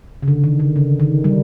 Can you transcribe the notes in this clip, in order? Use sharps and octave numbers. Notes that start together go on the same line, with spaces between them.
C#3
D3
D#3
D3
C#3
D#3
G3